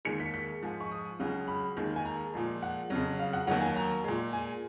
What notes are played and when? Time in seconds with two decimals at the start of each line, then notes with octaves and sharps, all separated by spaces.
0.05 D#2 D#3 G#3 C#7
0.20 B6
0.34 B6
0.62 G#2 F3 G#3
0.80 C#6
0.91 D#6
1.20 C#2 C#3 F#3
1.48 B5
1.77 D#2 D#3 G#3
1.96 G#5
2.05 A#5
2.34 A#2 F3 G#3
2.63 F#5
2.90 F2 C#3 F#3
3.19 F5
3.33 F#5
3.47 D#2 D#3 F#3 F#5
3.61 G#5
3.76 A#5
4.04 A#2 G#3
4.33 G#5